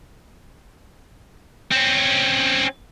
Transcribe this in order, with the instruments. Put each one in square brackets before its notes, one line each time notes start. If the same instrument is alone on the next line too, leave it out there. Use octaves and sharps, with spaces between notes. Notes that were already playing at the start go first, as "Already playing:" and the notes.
[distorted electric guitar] C4 C#4